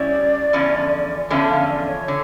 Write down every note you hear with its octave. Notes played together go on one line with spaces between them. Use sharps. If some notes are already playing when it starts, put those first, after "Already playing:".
Already playing: C#3 G3 C#4 E4 D5
E2 D3 F3 C#4
E2 D3 F3 C#4 E5
F5
D5
C#5
D3